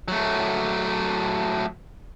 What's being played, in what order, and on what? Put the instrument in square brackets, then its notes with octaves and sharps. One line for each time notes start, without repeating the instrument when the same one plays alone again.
[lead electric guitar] F#3 A3